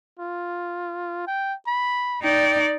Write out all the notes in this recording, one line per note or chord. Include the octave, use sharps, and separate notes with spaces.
F4
G5
B5
D#4 D5 G5